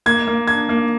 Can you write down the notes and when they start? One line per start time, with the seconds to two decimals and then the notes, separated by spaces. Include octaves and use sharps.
0.06 A#3 G#6
0.28 A#3
0.48 D4 G#6
0.69 A#3